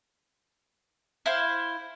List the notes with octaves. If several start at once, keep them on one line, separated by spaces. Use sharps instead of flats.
E4 C5 F5